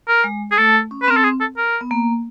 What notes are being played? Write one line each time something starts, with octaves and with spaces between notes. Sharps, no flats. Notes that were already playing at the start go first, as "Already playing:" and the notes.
A#4
G#3
G#4
A3 A4
C#4
B4
C4 A#4
A4
G#4
A4
A#4
B3
A#3